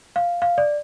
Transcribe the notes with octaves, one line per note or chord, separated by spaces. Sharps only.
F5
F5
D5